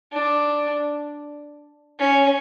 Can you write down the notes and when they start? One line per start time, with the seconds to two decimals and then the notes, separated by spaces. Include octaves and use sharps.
0.13 D4
1.99 C#4